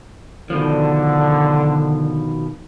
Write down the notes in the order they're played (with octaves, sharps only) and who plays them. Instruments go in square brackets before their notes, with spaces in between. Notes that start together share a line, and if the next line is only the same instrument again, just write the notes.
[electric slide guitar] B2 D#3 F3 [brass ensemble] D3